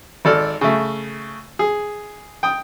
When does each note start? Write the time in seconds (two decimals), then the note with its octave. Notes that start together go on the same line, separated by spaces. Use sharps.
0.25 G#1 A4 D5 F6
0.61 C#3 A3
1.59 G#4
2.43 G5 D#6